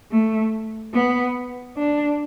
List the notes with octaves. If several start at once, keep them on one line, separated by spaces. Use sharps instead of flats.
A3
B3
D4